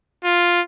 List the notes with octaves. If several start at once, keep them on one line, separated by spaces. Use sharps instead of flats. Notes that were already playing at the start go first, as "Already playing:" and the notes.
F4